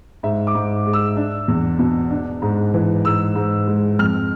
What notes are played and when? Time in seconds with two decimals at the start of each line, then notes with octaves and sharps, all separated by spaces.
0.23 G#2 E5
0.47 D6
0.55 G#2
0.86 G#3
0.93 E6
1.16 D4
1.48 E2
1.79 B2
2.10 D4
2.42 G#2
2.74 E3
3.05 G#2 E6
3.35 G#2
3.68 G#3
3.99 F2 F6